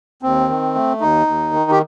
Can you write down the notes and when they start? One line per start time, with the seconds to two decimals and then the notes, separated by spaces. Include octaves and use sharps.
0.23 D#2 C4
0.48 D#3
0.75 A3
1.01 D#2 D#4
1.27 D#2
1.53 D#3
1.71 G4